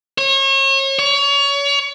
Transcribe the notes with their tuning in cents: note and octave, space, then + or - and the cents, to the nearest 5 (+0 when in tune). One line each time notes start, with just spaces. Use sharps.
C#5 -35
C#5 +30